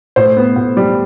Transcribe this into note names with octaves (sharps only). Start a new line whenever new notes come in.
A2 C5
B3
A2
G3